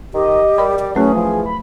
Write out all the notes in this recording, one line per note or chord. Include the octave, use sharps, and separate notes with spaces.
D#3 G4 D#5
G3 A#4 B5
D5
E3 F#3 A3 C#4 F#4 G#4
F3
B5